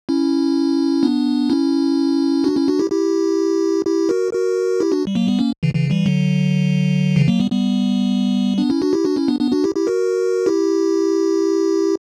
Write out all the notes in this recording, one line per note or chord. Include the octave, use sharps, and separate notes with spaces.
C#4 E4
B3 D4
C#4 E4
D4 F#4
C#4 E4
D4 F#4
E4 G4
E4 G4
E4 G4
F#4 A#4
F#4 A#4
E4 G4
D4 F#4
G3
F#3 A#3
G3 B3
A#3 C#4
C#3 E3
C#3 E3
E3 G3
D3 F#3
C#3 E3
F#3 A#3
G3 B3
G3 B3
B3 D4
C#4 E4
D4 F#4
E4 G4
D4 F#4
C#4 E4
B3 D4
B3 D4
D4 F#4
E4 G4
E4 G4
F#4 A#4
E4 G4